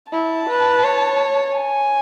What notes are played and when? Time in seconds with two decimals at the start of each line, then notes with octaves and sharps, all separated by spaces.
0.12 E4 A5
0.49 B4
0.84 C#5
1.56 G#5